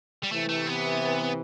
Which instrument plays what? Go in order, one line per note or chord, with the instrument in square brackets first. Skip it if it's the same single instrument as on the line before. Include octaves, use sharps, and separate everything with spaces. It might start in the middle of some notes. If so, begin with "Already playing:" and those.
[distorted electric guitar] G3
[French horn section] C3 E3 [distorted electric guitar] A3
[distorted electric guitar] A3
B3